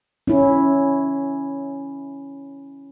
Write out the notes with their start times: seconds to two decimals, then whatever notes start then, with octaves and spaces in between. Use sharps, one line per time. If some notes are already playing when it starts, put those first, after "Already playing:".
0.27 C#4 E4